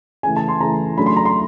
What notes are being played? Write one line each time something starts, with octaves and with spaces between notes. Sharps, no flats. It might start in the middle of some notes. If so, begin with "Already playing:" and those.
C#3 E3 A3 G#5
A5
C6
C#3 E3 A3 A#5
C#3 F#3 A3 D4 B5
C6
A#5
C6